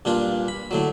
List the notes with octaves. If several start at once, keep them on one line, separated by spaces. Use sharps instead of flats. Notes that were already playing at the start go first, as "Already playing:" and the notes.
G2 A#2 D4 F4
B5
A2 D3 F#3